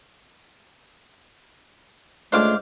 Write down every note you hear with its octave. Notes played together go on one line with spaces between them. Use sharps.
C#2 A3 D4 C5 F5 D6